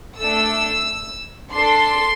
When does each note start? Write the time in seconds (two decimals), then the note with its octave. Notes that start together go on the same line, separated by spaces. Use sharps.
0.18 A3 D4 A4 E6
1.52 D4 A4 C6